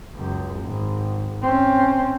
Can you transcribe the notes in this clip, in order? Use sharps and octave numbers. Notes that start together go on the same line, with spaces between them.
C#2 F#2
G#1
C4 C#4